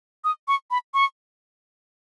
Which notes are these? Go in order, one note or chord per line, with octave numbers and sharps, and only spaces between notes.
D#6
C#6
B5
C#6